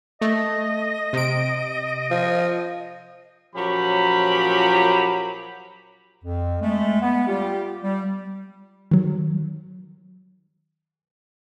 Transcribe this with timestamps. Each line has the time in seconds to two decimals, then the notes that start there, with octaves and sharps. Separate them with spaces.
0.21 A3 D#5
1.13 C3 D7
2.11 F3
3.55 A#2 F3 F#3 C#4 G4 B5
6.24 F2
6.61 G#3 A3
7.02 B3
7.27 G3 F4 G4
7.83 G3
8.91 D#3 F#3